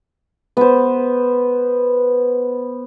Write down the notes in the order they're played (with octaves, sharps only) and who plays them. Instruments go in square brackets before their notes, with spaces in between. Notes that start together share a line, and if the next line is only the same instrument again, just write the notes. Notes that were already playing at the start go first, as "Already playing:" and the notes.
[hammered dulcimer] B3 C5